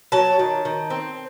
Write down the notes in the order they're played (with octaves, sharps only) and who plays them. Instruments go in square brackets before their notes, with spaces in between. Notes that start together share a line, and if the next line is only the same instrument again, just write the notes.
[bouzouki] F#3 A5
D#3
D#3
C4